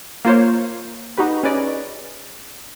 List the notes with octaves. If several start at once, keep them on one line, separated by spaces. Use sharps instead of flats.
A#3 F4 C5 C#5
D#4 F#4 G4 B4
C#4 G#4 B4 D5 D#5